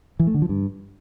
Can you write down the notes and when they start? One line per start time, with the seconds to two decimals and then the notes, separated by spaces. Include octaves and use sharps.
0.19 E3
0.27 A3
0.34 D3
0.42 F3
0.49 G2